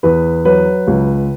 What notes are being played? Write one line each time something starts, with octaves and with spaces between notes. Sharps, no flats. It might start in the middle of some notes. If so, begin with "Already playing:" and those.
E2 B4
F#3 B4
C#2